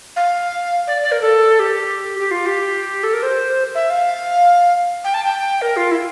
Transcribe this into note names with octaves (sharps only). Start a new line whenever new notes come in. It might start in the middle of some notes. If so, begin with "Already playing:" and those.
F5
D5
D5
A#4
A4
G4
G4
F4
G4
A4
A#4
C5
E5
F5
G5
A5
G5
A#4
F4
E4